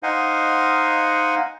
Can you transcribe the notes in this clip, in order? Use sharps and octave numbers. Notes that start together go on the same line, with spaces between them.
D#4 C5 D#5 F5 F#5 G#5